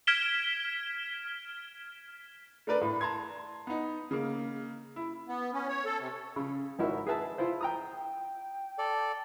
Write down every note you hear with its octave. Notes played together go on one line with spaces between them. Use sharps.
F6 G#6 B6 D7 E7 G7
A3 D4 A#4 B4 D5
A2
A5 A#5 C6 G#6
B3 D#4
C#3 A#3
E4
B3
C#4
C#5
A4
C3
C#3
G#1 D#4 E4 F#4 A#4
G#4 B4 E5 A5
E4 F4 C5
G5 A#5 D#6
G5
A4 D5